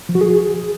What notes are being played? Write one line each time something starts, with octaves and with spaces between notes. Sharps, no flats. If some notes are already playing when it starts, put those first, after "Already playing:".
F3
F#4
G#4